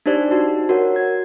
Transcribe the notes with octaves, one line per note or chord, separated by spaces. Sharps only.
D4 D#4 G4 C5 D5
D#4 F#4
F#4 A#4 C#5 F#5
G#6